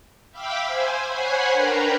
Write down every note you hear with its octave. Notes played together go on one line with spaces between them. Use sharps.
E5 F5 G5 B5 D6 E6
C5 G#5
C5 C#5 F#5 G#5 B5 C6
D4 A#4 B4 G5 A#5